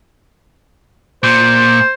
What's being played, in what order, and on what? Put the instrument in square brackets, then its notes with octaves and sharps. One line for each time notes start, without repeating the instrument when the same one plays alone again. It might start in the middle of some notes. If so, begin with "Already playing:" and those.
[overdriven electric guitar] A#2 [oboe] C5